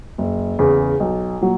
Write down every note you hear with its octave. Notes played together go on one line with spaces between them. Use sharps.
F#1
E2 C#3
B1
A#2 F#3